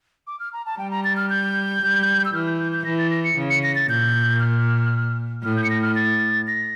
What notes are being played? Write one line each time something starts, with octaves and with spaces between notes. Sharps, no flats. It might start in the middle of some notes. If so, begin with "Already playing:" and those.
D6
F6
A#5
A5
G3 G5
A#5
A6
F6
G6
G3
E6
E3 F6
G6
G6
G6
E3 A#6
A6
A#6
C#7
C#3
C#7
A#6
A6
A#2 G6
F6
A2 F6
G6
C#7
A#6
F6
A6
A#6